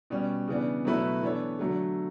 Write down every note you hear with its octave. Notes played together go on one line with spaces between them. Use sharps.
B2 G3 C#4
C#3 E3 B3 D4
B2 F#3 A3 E4 B4
E3 B3 D4 A4 C#5
D3 F#3 A3